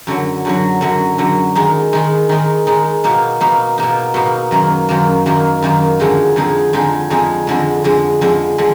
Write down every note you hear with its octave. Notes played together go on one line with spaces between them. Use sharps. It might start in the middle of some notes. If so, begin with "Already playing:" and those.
F#2 D3 F#3
F#2 D3 F#3
F#2 D3 F#3
F#2 D3 F#3
D#3 G#3 D#4
D#3 G#3 D#4
D#3 G#3 D#4
D#3 G#3 D#4
B2 A#3 D#4
B2 A#3 D#4
B2 A#3 D#4
B2 A#3 D#4
F#2 D#3 A#3
F#2 D#3 A#3
F#2 D#3 A#3
F#2 D#3 A#3
F2 D3 G#3 D#4 G#4
F2 D3 G#3 D#4 G#4
F2 D3 G#3 D#4 G#4
F2 D3 G#3 D#4 G#4
F2 D3 G#3
F2 D3 G#3
F2 D3 G#3
D3 G#3